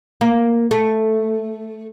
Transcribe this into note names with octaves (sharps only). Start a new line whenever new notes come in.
A#3
A3